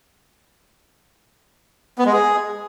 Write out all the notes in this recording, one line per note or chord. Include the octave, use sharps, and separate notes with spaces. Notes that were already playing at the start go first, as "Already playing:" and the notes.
B3
G#3
G#4